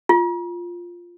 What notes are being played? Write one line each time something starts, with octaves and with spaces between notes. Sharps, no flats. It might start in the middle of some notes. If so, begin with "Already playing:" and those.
F4